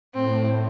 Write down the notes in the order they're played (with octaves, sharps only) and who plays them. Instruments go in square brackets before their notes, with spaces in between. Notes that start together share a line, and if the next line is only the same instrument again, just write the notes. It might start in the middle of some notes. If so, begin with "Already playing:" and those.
[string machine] A2 [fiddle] C4